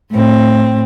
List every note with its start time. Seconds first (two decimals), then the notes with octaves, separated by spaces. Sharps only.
0.11 A2 C4